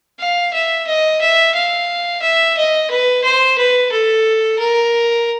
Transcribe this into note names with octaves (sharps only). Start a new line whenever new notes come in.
F5
E5
D#5
E5
F5
E5
D#5
B4
C5
B4
A4
A#4